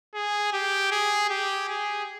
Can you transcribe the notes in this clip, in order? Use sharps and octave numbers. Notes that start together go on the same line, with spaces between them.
G#4
G4
G#4
G4
G#4